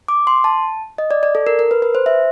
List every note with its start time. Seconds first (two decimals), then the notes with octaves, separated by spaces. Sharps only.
0.08 D6
0.27 C6
0.44 A5
0.98 D#5
1.11 D5
1.23 D5
1.35 A4
1.47 A#4
1.59 A#4
1.71 B4
1.82 B4
1.95 C5
2.06 E5